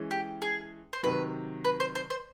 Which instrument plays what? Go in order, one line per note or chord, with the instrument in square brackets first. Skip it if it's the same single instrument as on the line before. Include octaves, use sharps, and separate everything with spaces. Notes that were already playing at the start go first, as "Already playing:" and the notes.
Already playing: [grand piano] E3 G#3 C#4
[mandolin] G4
G#4
C5
[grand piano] C3 D#3 F#3 [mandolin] B4
[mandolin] B4
C5
C5
C5